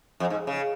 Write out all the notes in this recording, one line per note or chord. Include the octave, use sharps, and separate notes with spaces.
F2
G#2
C#3